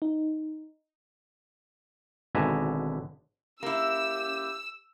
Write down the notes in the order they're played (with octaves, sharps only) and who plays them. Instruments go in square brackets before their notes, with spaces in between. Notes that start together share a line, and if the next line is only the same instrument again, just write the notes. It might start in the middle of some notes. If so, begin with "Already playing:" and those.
[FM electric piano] D#4
[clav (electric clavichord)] G#1 B2 D3 E5 G#5 A#5
[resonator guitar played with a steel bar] A#3 E4 [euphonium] C#4 [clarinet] G4 [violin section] E6